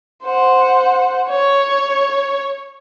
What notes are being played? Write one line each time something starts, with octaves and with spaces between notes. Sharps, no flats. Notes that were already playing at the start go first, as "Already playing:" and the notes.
C5 F#5
C#5